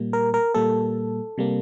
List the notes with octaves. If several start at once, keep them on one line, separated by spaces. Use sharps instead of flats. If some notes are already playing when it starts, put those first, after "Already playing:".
Already playing: A#2 G3 A#3
A#4
A#4
A#2 G3 A#3 A4
C3 G3 A#3